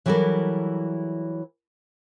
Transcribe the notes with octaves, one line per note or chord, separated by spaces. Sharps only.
E3 F#3 G3 E4 A4 A#4